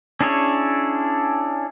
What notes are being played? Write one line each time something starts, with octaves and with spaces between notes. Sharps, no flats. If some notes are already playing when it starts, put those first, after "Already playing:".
C#4 D4 E4 G#4 C#5